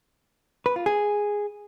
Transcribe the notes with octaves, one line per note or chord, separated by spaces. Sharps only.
B4
F4
G#4